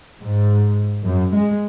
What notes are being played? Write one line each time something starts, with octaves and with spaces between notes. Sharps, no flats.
G#2
F#2
G#3